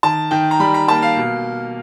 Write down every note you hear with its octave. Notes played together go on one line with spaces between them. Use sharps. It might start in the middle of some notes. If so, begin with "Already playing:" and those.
D#3 A5
D#3 G5
A#5
G3 B5
A#5
A#3 A5
F5
B2